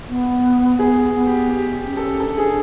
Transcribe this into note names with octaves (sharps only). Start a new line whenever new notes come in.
B3
B3 G#4
B3
G4
G4
G4
C#4
A4
D4 A4
G#4